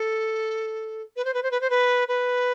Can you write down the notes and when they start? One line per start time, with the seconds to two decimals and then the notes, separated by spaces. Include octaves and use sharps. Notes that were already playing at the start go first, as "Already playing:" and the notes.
Already playing: A4
1.16 B4
1.25 C5
1.34 B4
1.43 C5
1.51 B4
1.61 C5
1.70 B4
2.08 B4